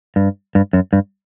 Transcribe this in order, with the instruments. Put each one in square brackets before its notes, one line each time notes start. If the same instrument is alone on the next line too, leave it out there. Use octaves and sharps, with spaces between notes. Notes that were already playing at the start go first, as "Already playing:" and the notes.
[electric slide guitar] G2
G2
F#2
G2